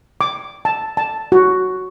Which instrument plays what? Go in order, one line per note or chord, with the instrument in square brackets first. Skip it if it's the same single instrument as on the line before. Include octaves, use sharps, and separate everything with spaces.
[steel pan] D6
A5
A5
F#4